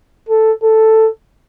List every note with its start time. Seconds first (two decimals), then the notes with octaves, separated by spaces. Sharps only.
0.29 A4
0.63 A4